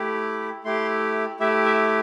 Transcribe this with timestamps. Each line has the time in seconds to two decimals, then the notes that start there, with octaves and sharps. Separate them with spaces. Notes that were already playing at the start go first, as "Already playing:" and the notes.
Already playing: A3 E4 G4
0.65 A3 E4 G4 C6
1.40 A3 E4 G4 E5
1.65 E5